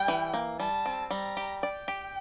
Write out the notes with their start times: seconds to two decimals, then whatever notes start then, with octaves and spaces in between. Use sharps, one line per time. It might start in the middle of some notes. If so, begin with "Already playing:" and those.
Already playing: G3 G5
0.08 E3
0.34 A#3
0.60 G3 A5
0.86 C4
1.10 G3 A#5
1.37 G4
1.63 D5 G5
1.88 G4